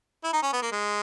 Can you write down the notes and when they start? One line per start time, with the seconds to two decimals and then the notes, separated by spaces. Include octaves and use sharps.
0.24 E4
0.33 D#4
0.43 C#4
0.53 B3
0.62 A#3
0.72 G#3